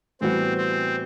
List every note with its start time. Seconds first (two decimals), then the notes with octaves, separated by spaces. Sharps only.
0.21 A2 E3 G3 B3 C4 F#4
0.57 C4